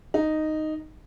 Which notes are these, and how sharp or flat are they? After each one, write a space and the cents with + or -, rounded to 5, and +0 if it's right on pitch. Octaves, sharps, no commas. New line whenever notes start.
D#4 -5